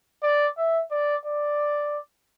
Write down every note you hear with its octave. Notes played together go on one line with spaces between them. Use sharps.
D5
E5
D5
D5